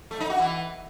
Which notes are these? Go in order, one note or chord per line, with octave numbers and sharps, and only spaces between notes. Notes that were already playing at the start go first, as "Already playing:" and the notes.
A3
D#4
F#4
E3